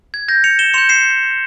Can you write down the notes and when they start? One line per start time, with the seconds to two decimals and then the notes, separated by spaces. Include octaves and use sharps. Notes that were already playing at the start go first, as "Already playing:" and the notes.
0.14 G#6
0.28 G6 A#6
0.44 C#7 F7
0.59 E7 G7
0.74 C6 G6 C#7 F7
0.89 C7 E7